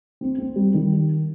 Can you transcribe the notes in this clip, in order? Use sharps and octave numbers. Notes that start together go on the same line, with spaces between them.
C4
C4
G3
D#3